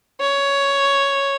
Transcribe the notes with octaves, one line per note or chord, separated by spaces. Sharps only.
C#5